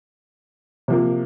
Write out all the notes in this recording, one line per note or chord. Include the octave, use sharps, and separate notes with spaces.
C3 F3 A#3